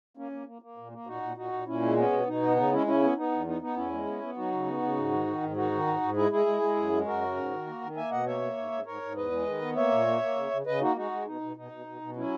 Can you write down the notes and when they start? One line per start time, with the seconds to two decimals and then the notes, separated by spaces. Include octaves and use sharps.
0.17 A#3 C#4
0.32 A#3
0.47 A#3
0.62 A#3
0.77 A#2
0.92 A#3
1.07 A#2 D#4 F#4
1.22 A#2
1.36 A#2 D#4 F#4
1.53 A#2
1.67 A#2 C#4 E4
1.82 G#3
1.97 B3 C#4
2.12 B2
2.27 B2 D#4
2.42 B3
2.56 C#3 D#4
2.71 G#3 C#4 E4
2.87 C#3 C#4 E4
3.02 B3
3.17 B3 D#4
3.32 E2
3.47 B3 D#4
3.61 B3 D#4
3.76 E2 C#4 E4
3.92 G#3
4.07 B3
4.22 B3
4.37 F#3 D#4 F#4
4.52 C#3
4.67 B3
4.82 C#3
4.97 G#2
5.12 D#3
5.27 D#3
5.42 G#2
5.56 D#3 D#4 F#4
5.72 D#3
5.87 G#2
6.01 G#2
6.16 G#3 E4 G#4
6.31 G#3 E4 G#4
6.46 G#3
6.62 G#3
6.76 F#2
6.92 G#3
7.06 F#2 F#4 A#4
7.21 C#3
7.36 G#2
7.52 D#3
7.66 A#3
7.82 D#3
7.96 A#3 E5 G#5
8.11 B2 D#5 F#5
8.26 A#3 C#5 E5
8.42 A#3
8.57 G#2
8.72 G#2
8.86 G#2 A#4 C#5
9.02 G#2
9.16 E2 B4 D#5
9.32 G#3
9.46 D#3
9.62 B3
9.76 A#3 C#5 E5
9.91 A#2
10.07 A#3
10.21 A#3
10.36 C#3
10.51 C#3
10.66 C#3 B4 D#5
10.81 A#3 D#4 F#4
10.96 G#3 D#4 F#4
11.11 G#3
11.26 B2 D#4
11.41 B2
11.56 B2 D#4
11.72 B2
11.86 B2
12.01 B2
12.16 F#3 C#4 E4